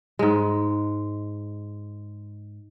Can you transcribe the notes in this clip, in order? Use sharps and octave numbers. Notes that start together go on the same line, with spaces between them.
G#2 G#3